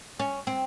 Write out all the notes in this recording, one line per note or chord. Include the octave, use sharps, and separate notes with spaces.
C#4
C4